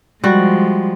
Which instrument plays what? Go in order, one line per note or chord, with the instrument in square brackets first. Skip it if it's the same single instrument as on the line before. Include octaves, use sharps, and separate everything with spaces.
[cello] F3 G#3 [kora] G3 F#4